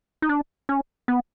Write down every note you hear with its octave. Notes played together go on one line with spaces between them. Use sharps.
D#4
D4
C#4
B3